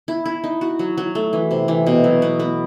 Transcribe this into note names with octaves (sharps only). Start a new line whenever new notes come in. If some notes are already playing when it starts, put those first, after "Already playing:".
E4
E4
D#4
F#4
F#3
F#3
A3
E3
C3
E3
B2
F#3
B3
B3